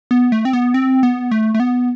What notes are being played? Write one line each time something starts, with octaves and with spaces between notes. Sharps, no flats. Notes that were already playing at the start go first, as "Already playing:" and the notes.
B3
A3
C4
B3
C4
B3
A3
A3
B3